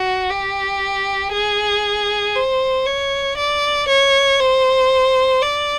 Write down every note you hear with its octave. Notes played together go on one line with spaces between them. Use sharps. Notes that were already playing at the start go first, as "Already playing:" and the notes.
Already playing: F#4
G4
G#4
C5
C#5
D5
C#5
C5
D5